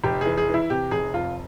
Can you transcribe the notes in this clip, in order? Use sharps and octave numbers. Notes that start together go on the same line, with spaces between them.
F1 G4
E3 G#4
G#4
E3
E4
C3 G4
F1 G#4
F2 F4